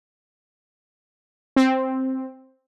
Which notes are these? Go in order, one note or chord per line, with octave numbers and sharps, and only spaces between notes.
C4